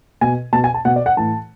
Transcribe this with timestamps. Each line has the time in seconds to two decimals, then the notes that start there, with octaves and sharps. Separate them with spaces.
0.21 B2 G#5
0.53 B2 A5
0.64 G#5
0.74 A5
0.85 B2 F#5
0.96 D5
1.06 F#5
1.17 A2 E3 A5